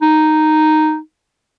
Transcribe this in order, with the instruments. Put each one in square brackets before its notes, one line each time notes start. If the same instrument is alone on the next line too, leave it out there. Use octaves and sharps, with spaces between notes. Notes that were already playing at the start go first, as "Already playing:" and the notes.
[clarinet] D#4